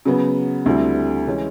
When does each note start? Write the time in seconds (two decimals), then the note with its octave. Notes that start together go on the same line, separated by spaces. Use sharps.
0.05 C#3 F#3 B3
0.66 D2 D3 G3 C4 E4
1.27 E3 G#3 C#4